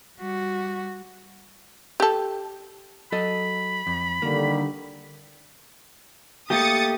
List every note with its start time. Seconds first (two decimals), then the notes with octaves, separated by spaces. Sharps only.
0.18 G3 F#4
2.00 G4 A4
3.12 F#3 A4 D#5 B5
3.87 F2
4.22 D3 D#3 G3 A#3
6.50 A3 A#3 G4 D#6 A6 C#7